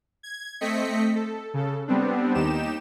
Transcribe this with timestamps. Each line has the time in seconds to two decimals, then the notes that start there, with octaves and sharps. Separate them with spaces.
0.23 G#6
0.61 A3 C4 D#5 B6 C#7
1.15 A4
1.54 C#3 A4
1.88 G3 B3 C4 D4
2.34 D#2 D#4 G4 E7